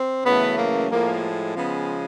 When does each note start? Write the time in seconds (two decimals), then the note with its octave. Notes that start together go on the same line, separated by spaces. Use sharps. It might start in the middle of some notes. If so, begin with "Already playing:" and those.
Already playing: C4
0.23 F#2 C#3 E3 A3 B3
0.56 A#3
0.89 A2 F3 G#3 A#3
1.55 C#3 F3 G#3 B3